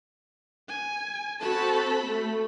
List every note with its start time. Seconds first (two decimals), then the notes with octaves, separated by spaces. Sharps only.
0.68 G#5
1.41 C4 F#4 A4 A5 B5
2.02 A3